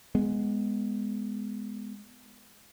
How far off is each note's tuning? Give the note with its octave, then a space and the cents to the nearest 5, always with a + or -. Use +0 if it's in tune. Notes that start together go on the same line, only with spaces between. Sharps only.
G#3 +0 B3 +5